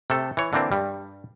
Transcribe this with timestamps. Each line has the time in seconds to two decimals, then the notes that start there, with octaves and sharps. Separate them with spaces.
0.10 C3 A3 A4
0.37 E3 C#5
0.53 D3 E3 A#3 C4 D4
0.72 G2 G3